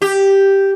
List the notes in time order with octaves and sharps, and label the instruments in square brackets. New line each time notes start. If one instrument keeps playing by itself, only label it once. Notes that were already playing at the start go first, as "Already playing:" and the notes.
[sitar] G4